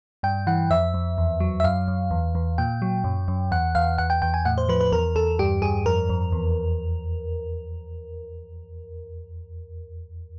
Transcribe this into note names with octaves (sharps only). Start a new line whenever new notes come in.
G2 G5
E3 F#5
F2 E5
F2
E2
F#3
E5
F#2 F5
F#2
E2
E2
A#2 G5
F#3
F#2
F#2
E2 F#5
E2 F5
E2 F#5
G5
E2 G5
G#5
A2 F#5
C5
F3 B4
B4
E2 A#4
E2 A4
G2 G4
G2 G#4
F2 A#4
F2
E2